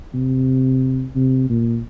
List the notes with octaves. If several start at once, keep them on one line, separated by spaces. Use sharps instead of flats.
C3
C3
A#2